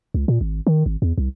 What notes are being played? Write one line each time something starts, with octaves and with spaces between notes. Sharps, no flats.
C#2
A#2
G#1
D#3
G#1
E2
C2